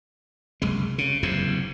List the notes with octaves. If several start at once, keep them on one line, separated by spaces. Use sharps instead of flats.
F#1 C2 G#3
C#3
F#1 E2 G2 C3